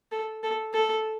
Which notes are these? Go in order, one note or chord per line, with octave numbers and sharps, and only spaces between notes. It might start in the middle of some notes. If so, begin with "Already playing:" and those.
A4
A4
A4